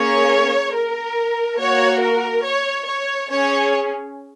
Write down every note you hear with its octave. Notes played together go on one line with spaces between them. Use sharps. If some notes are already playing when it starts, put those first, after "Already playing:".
Already playing: A#3 C#4 G#4 C#5
A#4
A#3 F#4 C#5
A#4
C#5
C#5
C#4 G#4 C#5